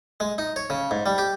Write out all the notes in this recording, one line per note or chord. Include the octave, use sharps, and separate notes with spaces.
G#3
D#4
C#5
C#3
G#2
G3
G4